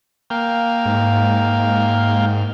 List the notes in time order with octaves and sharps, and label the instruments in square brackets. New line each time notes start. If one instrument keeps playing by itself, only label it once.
[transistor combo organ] A#3 F5 G5
[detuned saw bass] G#2